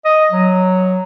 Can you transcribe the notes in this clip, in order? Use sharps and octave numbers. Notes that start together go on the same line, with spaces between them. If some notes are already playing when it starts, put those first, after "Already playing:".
D#5
F#3